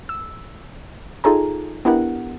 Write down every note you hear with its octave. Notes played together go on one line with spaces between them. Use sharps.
E6
D#4 F4 G#4 A4 G#5 A#5
B3 D4 E4 G4 A#4 F#5